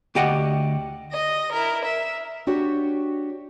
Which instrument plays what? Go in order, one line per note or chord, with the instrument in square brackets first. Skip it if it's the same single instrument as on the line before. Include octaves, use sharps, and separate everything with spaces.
[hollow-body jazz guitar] D2 G4 D#5 F#5
[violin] D#5 A#6
E4 A#4
E5
[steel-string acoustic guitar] D4 F#4 G4 C#5